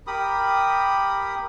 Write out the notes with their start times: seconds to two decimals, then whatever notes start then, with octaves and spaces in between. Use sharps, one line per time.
0.07 G4 A#4 B5 D#6